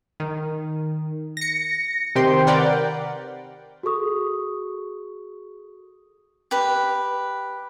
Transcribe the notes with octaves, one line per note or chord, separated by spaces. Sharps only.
D#3
A#6 C#7
C3 D#3 G4 C5 G5 C6
A#4 B4 D5 F#5 G5
F#4 G#4 A4 C#6 D#6
G4 B4